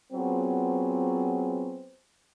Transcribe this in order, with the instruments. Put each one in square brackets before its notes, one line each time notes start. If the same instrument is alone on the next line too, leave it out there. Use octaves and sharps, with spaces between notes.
[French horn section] F#3 B3 C4 F4 G#4